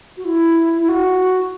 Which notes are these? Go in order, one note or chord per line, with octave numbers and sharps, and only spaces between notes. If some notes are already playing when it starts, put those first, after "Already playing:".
F#4
E4
E4
F#4